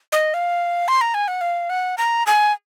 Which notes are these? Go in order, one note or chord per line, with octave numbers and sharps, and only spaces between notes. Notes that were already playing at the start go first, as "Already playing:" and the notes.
D#5
F5
C6
A#5
G#5
F#5
F5
F#5
A#5
G#5